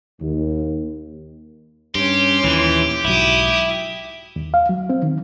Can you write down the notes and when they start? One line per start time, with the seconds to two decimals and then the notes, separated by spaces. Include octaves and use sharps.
0.20 D#2
1.95 G2 C#4 G4 C6
2.44 D#2 A#2 E3
3.05 B1 G#2 F#3 E4 D6 D#6
4.36 D#2
4.54 F5
4.69 F#3
4.90 C4
5.03 D#3